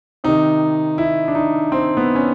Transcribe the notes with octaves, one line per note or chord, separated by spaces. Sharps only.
C3 D#3 D#4
E4
D4
D#4
C4
B3
C#4